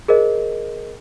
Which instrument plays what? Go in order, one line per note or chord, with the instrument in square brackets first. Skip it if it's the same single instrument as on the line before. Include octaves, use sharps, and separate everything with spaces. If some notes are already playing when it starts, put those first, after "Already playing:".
[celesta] G#4 A#4 C5 D#5